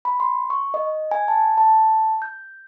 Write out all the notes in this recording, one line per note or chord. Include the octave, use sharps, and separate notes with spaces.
B5
C6
C#6
D#5
G#5
A5
A5
G6